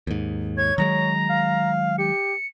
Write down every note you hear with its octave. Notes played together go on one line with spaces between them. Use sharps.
D#2 G#2
C#5 G#6
D#3 F#3 G#3 A#5
F5
G4 C#7